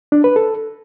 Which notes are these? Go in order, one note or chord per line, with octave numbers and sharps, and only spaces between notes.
D4
B4
A4